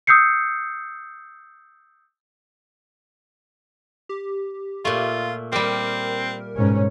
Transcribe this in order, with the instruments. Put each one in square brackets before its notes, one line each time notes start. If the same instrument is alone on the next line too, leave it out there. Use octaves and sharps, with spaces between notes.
[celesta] D#6 E6 G6 C7 C#7
[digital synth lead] G4
[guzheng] A#2 A3 [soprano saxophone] F4
[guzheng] G3 G4 [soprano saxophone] C4 [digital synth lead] A#4
[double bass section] G#2 B2 C#4